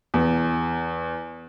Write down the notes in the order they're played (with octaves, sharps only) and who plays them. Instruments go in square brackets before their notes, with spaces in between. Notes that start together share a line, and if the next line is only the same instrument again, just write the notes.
[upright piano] E2